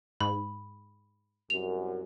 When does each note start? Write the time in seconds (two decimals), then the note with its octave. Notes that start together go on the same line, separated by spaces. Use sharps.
0.20 G#2 B5
1.50 C2 F#2 F7